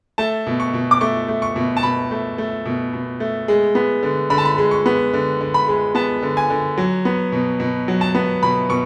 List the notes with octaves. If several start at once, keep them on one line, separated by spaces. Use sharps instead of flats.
A3 A5
B2
C#6
B2
D6
A3 C#6
A3
C#6
B2
A5
B2 B5
A3
A3
B2
B2
A3
G#3
B3
D3
D3 B5
A5
B5
G#3
C#6
B3
D3
D3
B5
G#3
B3 A5
D3
G#5
D3
F#3
B3
B2
B2
F#3
A5
B3
B2 B5
B2 C#6